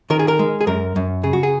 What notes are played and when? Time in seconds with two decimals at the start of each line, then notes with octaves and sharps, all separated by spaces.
0.10 D#3 A#4
0.19 G#4
0.28 A#4
0.39 G#3
0.61 G#4
0.67 F#2 A#4
0.96 F#2
1.23 C#3 G#4
1.33 F#4
1.43 G#4